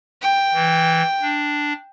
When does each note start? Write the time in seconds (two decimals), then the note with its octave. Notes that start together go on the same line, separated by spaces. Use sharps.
0.22 G5
0.54 E3
1.22 D4